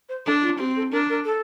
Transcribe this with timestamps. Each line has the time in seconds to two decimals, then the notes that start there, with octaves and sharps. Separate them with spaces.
0.09 C5
0.26 D4 A4
0.42 F4
0.59 C4 G4
0.76 A4
0.92 D4 A#4
1.09 A#4
1.25 A4